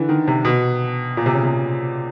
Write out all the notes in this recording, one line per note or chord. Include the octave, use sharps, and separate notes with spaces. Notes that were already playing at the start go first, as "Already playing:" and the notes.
Already playing: D3 E3
D#3
C3
B2
A#2
C3
C#3
C3